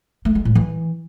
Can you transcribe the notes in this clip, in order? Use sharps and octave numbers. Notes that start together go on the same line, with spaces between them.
A3
G#3
A2
E3